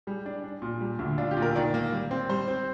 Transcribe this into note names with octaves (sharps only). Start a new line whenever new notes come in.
G3 G#4
D4
D4
A#2
G3
D2
D4 F4
G4
A#2
A#4
D#3 D5
A#3
G3
C4
G3 C5
C4